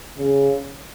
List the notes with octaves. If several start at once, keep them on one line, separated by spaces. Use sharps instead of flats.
C#3